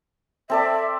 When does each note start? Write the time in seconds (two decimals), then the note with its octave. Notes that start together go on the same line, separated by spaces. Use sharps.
0.50 C4 A4 D5 E5